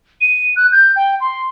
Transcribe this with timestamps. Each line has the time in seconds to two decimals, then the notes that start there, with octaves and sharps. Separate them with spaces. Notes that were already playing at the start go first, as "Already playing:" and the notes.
0.21 D#7
0.56 F#6
0.72 G6
0.96 G5
1.21 C6